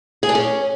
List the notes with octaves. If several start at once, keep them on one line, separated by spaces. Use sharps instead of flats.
G#4
D4
C#4